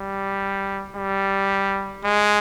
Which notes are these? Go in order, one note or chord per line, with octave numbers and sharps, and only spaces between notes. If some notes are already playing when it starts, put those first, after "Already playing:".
Already playing: G3
G3
G#3